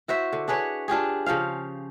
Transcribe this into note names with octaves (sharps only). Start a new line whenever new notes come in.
E4 F#4 C5 E5
D3
D4 G#4 B4 C#5
D4 F4 G4 G#4
C#3 F3 C5 F5